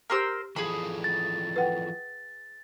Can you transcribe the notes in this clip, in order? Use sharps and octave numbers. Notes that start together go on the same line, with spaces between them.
G4 A#4 C5 A#5 E6
E3 F3 G#4 A4 B5
A6
B4 F#5 G5